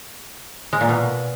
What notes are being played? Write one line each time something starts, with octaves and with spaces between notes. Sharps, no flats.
G#3
A#2
B2